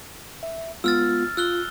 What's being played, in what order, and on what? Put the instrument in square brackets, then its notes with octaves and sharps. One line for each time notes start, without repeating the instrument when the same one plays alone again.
[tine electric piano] E5
[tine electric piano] G#3 B3 F4 [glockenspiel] E6 F6 A6
[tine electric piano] F4 [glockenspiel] E6 F#6 G7